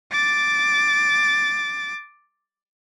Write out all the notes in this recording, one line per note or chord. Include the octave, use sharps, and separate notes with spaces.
D6 A6